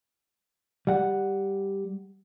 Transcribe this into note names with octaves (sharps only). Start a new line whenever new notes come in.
G3 F#5